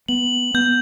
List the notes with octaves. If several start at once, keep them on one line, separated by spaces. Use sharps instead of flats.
B3 F#7
B3 G6